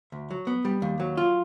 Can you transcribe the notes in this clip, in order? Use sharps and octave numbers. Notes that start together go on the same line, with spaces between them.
D2
F#3
B3
G3
D#2
F#3
F4